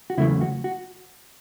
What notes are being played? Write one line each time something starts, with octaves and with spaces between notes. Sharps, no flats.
F#4
E2 C#3 F#3 A3 E4
F#4
F#4